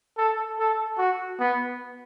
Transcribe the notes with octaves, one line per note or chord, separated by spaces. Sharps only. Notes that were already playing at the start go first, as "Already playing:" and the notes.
A4
A4
F#4
B3